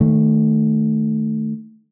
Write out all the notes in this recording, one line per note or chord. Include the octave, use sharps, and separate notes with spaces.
D#3 A3